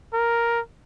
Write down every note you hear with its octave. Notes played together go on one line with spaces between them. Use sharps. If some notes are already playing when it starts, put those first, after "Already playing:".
A#4